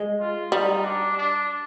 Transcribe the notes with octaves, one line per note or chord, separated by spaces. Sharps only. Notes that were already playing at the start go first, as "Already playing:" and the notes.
Already playing: G#3
F4
G3 D#4
D4
D4